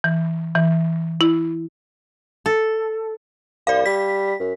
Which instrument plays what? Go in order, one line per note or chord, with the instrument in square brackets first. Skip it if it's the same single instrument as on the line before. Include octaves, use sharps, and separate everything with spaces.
[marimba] E3
E3
E4
[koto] A4
[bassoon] C2 [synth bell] D5 F5
[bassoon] G3 [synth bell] B6
[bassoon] F#2